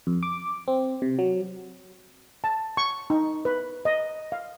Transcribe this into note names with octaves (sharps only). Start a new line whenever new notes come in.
F2
D6
C4
C3
F#3
A5
C#6
D#4
B4
D#5
F5